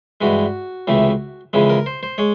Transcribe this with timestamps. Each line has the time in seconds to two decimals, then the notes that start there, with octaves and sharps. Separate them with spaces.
0.21 G2 E3 G#3 F#4
0.87 C#2 C3 E3 A3
1.53 F2 C#3 E3 G#3
1.69 A#4
1.86 C5
2.03 C5
2.18 G#3 C#5